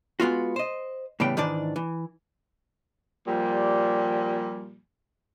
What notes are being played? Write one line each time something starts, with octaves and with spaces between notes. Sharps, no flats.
G#3 B3 F4 F#4
C5 D#5
A2 C#3 E3 G3 B3 G5
G#2 D#3 E3 D4 D5
E3
A#2 F3 G3